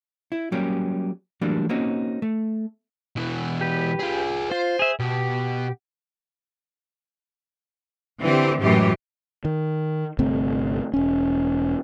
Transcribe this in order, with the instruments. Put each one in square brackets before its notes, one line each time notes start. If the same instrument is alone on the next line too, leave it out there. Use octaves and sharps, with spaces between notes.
[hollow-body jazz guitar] E4
F#3 G3 A#3 C#4 G4
E3 F#3 G3 A3 A#3 D4
A#3 C4 C#4 D#4 F#4
A3
[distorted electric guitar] B2 E3
[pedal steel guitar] G4 B4
[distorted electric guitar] F4 G#4
[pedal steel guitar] F4 [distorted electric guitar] C5
[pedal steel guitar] G#4 E5
[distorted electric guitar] B2 [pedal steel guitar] G4
[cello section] D3 E3 C4 G4
F#2 A2 E3 G#3 G4
[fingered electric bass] D#3
G1 C3 A3 C4
E1 C#4